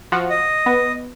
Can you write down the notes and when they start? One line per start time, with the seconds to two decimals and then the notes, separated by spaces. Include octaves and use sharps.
0.12 F3 F#4
0.30 D#5
0.66 B3